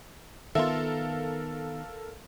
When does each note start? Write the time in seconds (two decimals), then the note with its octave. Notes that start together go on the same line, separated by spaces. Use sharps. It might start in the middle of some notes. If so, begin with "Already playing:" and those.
0.55 D#3 B3 F4 A4 A#4 E5 F5